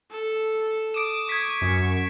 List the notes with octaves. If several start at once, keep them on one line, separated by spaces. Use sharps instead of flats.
A4
D6 D#6 D7 E7
C#6 G#6 B6
F#2